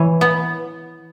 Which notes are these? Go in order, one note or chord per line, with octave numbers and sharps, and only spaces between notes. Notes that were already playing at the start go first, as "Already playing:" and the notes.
Already playing: E3 C#5
B3